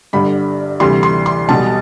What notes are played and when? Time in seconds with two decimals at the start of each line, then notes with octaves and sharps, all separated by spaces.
0.13 G1 G2 D3 G3 B5
0.80 D2 C3 E3 G3 C6
1.03 C6
1.26 C6
1.48 B1 B2 G3 A5